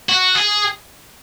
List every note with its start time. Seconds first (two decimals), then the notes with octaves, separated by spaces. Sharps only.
0.09 F#4
0.35 G#4